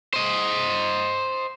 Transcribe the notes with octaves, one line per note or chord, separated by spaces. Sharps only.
C5 D#5